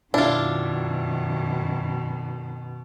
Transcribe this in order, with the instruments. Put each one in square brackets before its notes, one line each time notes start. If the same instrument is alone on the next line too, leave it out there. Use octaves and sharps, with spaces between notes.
[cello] F#2 D#3 [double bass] B2 [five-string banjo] D4 F4 [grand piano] E4